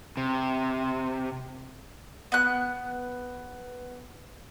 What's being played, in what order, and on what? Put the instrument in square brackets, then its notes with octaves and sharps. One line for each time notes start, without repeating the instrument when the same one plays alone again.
[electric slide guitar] C3
[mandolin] B3 F#6